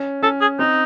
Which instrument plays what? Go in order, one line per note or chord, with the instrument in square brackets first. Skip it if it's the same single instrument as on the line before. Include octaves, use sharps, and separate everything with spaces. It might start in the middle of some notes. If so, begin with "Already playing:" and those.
Already playing: [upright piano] C#4
[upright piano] C#4 [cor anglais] A4
[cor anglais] G#4
[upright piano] C4 [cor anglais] D#4